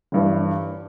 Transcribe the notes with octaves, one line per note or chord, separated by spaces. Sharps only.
G1 G2 E3